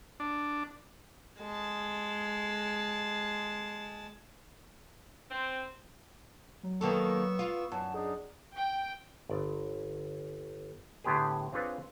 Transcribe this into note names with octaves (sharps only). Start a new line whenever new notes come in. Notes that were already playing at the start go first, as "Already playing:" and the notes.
D4
G#3 A5
C4
F#3
D#3 A#3 B3 A4 C#6 E6
F4
F#2 A5
D4 D#4 G#4
G5
G1 D5
A2 D3 B3 G4 G#4
C4 D4 F4 G#4 B4 C#5